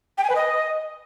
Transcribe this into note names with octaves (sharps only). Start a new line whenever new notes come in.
G5
G#5
B4
D#5